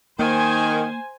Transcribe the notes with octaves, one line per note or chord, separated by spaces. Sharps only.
D#3 A#3 C5 G#5